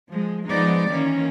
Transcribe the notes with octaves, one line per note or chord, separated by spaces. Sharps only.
F3 G#3
F3 G#3 B3 D#4 D5
D#3 E3 A#3 C#4